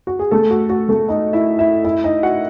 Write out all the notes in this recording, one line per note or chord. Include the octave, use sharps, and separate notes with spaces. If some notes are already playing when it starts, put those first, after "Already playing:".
F#4
G#4
A3 A4
F#4
F#4
A3 A4
D#4 D#5
E4 E5
E4 E5
E4 E5
D#4 D#5
F#4 F#5